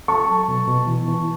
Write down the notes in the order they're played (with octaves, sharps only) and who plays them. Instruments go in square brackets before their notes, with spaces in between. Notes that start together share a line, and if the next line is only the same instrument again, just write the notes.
[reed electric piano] A4 [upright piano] A5 C#6
[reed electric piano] F#3
B2
B2
E3
E3